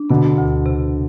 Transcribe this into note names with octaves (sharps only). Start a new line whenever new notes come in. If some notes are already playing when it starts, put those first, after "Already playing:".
Already playing: D4
B2 D3 B3
D2
C3